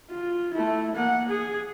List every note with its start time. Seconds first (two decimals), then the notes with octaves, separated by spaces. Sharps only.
0.10 F4
0.54 A3 E4
0.95 A#3 F#5
1.29 G#4